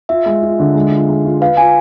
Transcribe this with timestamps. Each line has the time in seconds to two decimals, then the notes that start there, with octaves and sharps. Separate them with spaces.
0.09 F4 E5
0.26 G#3
0.43 F4
0.59 D3
0.75 G#3
0.91 F4
1.09 G#3
1.25 F4
1.41 B4 F5
1.57 F4 G#5